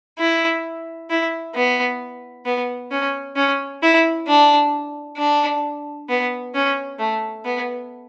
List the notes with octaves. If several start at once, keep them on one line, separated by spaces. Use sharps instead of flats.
E4
E4
B3
B3
C#4
C#4
E4
D4
D4
B3
C#4
A3
B3